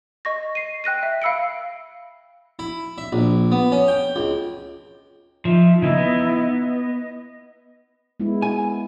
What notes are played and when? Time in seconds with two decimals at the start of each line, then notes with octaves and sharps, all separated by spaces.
0.25 D#5 C#6 A#6
0.55 C7 D#7
0.84 G5 F#6 A#6 D#7
1.03 E5
1.22 F5 B5 E6 C#7 D7
2.59 E4
2.98 E5
3.12 A#1
3.52 B3
3.72 C#4
3.88 G5
4.16 C#2
5.45 F3 D#4 E5
5.82 C#3 E3 A#3 D#4 E4 D#5
5.98 B3
6.62 D#5
8.20 G#3 B3 E4
8.42 G#5